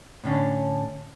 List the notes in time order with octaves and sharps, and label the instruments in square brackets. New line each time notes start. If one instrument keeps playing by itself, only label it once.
[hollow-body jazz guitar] A2 D3 C#4 D4